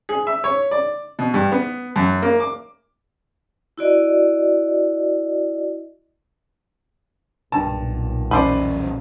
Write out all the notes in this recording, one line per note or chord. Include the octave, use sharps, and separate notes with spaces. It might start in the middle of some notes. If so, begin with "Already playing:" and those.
G#4
E5
C#5
D5
B2
G2
B3
F#2
A#3
D6
E4 F#4 D5 D#5
B1 G2 A#2 A5
E2 C#4 B4 C5 D5